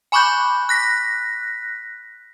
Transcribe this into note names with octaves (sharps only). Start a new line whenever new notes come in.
G#5 B5 C#6 D6 F#6 G6
F#6 A#6 B6